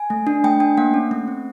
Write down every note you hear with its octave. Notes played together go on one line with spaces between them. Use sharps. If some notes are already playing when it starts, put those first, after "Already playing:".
Already playing: G#5
A3
D4
A3 G5
D4 G5
A#3 F#5
C#4
A3
C4